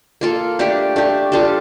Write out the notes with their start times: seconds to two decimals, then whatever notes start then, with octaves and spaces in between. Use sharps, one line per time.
0.21 A#3 F4 A4
0.59 A3 D4 G4
0.96 A3 D4 G4
1.32 G3 D4 F4 A4